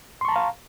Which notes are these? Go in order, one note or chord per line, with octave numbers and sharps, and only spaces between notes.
F5 A5 A#5 C6 C#6